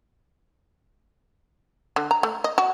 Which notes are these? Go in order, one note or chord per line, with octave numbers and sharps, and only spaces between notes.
D3
A#5
A3
D#5
F#4